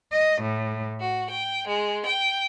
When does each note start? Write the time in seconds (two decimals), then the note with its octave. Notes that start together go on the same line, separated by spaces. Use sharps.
0.11 D#5
0.42 A2
1.00 F#4
1.29 G5
1.68 G#3
2.05 G5